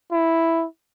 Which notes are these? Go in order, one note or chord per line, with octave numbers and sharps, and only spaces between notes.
E4